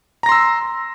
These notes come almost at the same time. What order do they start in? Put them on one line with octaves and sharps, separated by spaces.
A#5 A#6 C6 E6